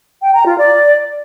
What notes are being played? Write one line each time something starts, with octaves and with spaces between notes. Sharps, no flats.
G5
A#5
F4
D5